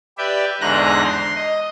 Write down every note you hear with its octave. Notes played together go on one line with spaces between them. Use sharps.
G4 B4 D5 E5 G5
E2 G#2 D3 A#5 F#6 A#6
C6
D#5